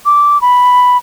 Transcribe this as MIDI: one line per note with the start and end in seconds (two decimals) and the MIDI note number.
0.06 0.40 86
0.42 0.97 83